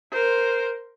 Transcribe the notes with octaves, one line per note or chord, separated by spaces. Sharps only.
A#4 C5